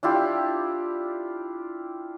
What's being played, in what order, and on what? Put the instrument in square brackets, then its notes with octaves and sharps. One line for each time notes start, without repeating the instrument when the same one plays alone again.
[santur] D4 E4 F4 G4